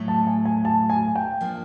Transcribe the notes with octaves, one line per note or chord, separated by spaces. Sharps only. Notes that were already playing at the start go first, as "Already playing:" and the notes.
Already playing: A2 F#3 A3
A5
G#5
G#5
A5
G#5
G5
F3 A#3 D4